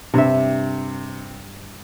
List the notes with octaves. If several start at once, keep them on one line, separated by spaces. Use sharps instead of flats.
G2 C3 E5